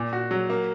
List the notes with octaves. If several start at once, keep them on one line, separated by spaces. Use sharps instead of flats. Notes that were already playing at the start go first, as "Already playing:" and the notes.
Already playing: A#2
F#4
F#3
A#3